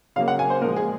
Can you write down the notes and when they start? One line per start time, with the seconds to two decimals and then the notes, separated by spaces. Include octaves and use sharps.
0.16 C#3 F#3 A#3 F5
0.28 F#5
0.39 G#5
0.50 C5
0.61 A#2 F3 G#3 A#4
0.77 G#4